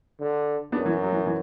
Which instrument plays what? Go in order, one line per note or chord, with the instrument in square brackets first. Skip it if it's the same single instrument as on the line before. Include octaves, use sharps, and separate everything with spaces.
[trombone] D3
[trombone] F#2 [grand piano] B3 D4
[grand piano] E3
F#3
E3
E3